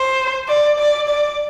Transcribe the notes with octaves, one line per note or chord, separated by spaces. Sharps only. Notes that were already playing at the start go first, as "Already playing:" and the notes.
Already playing: C5
D5
D5
D5